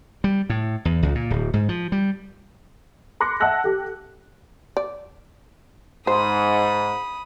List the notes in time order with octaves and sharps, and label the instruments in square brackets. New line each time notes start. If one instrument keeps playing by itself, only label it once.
[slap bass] G3
A2
E2
C#2
A#2
D1
G#2
F3
G3
[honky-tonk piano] B5 C6 D6 F#6 A#6 C#7
E5 F#5 A5 E6 F#6 A#6
G4 A4
[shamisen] D5
[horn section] G#2 [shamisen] C5 [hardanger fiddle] B5 D#6